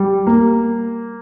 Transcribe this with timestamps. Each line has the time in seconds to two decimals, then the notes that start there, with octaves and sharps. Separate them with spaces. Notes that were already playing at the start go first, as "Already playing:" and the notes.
Already playing: G3
0.27 A#3